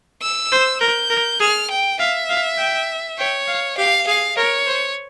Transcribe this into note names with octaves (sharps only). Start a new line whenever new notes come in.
E6
C5
A#4 G6
A#4
G#4 F6
G5
E5 F5
F5
G5
C#5 G5
F5
G4 F5
G#4 F5
A#4 C#5
C5